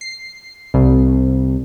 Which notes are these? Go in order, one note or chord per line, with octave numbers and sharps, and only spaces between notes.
C7
C2